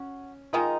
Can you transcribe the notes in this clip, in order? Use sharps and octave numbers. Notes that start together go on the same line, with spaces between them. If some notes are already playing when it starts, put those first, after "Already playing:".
Already playing: C#4 F#4
D#3 G#3 D#4 F4